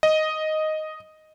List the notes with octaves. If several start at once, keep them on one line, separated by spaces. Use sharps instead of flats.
D#5